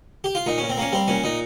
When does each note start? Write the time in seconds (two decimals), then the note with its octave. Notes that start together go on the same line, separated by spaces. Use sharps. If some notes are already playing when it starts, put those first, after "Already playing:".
0.24 G4
0.35 F4
0.46 A#2 D#4
0.58 A#2 C#4
0.70 C4
0.78 A#3 C#4
0.92 G3 C4
1.08 A#2 C#4
1.23 A#2 D#4